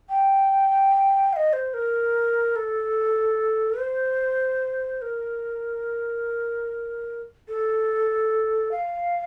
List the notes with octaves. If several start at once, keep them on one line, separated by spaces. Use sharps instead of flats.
G5
F5
D#5
C5
A#4
A4
C5
A#4
A4
F5